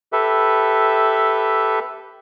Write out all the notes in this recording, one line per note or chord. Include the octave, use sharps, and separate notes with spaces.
G4 A4 B4 E5